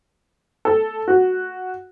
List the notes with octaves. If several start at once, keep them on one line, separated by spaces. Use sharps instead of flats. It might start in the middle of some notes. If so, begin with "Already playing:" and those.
A4
F#4